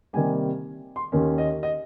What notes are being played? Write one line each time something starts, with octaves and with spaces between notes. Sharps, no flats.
C3 D#3 G3 A#3 G#5
C6
D#2 D#3 A#3 C#4
D#5
D#5